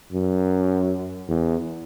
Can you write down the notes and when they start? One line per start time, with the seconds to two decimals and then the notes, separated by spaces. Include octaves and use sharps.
0.12 F#2
1.29 E2